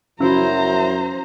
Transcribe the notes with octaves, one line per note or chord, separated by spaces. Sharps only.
F#2 C#3 F#3 E4 C5 A#5